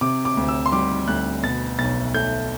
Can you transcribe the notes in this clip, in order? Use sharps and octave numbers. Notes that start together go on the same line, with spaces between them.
C3 D6
D6
D2
E6
C6
G3 D6
D2 F#6
B2 A6
B1 A6
A3 G6